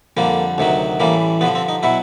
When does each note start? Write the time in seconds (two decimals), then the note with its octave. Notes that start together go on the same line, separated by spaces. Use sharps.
0.17 F2 D3 G3 A#3
0.58 D2 C3 D#3 F#3
1.00 A1 A2 E3 G3 A#3
1.41 G2 D3 F3 B3
1.55 C4
1.69 D#4
1.83 B2 F#3 E4